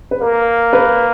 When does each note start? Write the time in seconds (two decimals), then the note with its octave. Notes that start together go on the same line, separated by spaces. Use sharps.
0.11 B4
0.21 A#3 A#4
0.73 B4